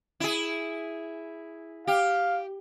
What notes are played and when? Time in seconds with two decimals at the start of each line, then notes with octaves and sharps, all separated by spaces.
0.20 E4 G#4
1.87 G4 F5